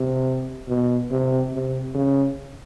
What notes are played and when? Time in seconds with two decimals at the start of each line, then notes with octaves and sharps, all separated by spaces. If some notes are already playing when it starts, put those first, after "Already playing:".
Already playing: C3
0.68 B2
1.11 C3
1.53 C3
1.95 C#3